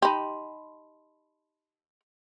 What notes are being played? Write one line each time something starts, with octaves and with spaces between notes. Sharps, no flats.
D#4 G4 A5 B5 C6